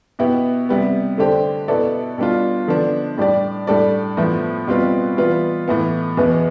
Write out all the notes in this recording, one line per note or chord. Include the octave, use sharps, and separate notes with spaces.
B2 B3 E4 G4
C3 G3 B3
D3 A3 D4 G4 C5
B2 B3 E4 A4 D5
B2 G3 D4 F4
D3 F3 B3 D4
A2 G3 D4 G4 D5
A2 G3 D4 A4 D5
A2 F3 B3 E4
B2 G3 C4 F4 B4
E3 G3 B3 F4 B4
A2 E3 B3
E2 B2 B3 E4 B4